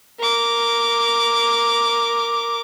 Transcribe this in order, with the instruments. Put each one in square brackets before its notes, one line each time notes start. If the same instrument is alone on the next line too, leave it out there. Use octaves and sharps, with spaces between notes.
[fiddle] A#4 D6